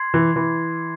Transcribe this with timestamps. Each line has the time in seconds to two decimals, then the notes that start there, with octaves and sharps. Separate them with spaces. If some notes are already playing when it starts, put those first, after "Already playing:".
Already playing: C6 G#6 C7
0.14 E3
0.36 E3